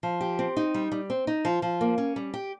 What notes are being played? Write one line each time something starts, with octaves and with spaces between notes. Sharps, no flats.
F3
G4
C4
D#4
G3
G3
C4
D#4
F3
F3
A#3
C#4
G3
G4